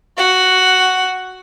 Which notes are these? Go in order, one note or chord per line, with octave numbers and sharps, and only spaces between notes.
F#4 F#5